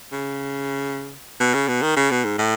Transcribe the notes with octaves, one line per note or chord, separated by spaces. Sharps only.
C#3
B2
C#3
B2
D#3
C#3
B2
G#2
A2